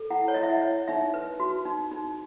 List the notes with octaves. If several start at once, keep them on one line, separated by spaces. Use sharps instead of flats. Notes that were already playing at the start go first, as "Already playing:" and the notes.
Already playing: A4
E4 F#5
C#5
D#5
E4
E5
F#5
C#5
D#4 E5
B4
F#4
D#4
D#4